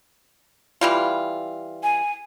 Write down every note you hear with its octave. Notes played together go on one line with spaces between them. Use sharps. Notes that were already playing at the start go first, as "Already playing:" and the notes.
E3 G3 F4
G#5